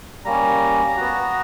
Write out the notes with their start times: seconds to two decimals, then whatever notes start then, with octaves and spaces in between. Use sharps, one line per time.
0.25 G3 A#3 C#4 A#5
0.96 B3 F#4